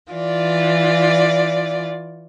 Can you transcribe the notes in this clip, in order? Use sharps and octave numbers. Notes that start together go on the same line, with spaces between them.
E3 F4 D5